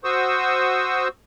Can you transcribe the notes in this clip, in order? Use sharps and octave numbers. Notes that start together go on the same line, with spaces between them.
F#4 C5 C#6 D#6 E6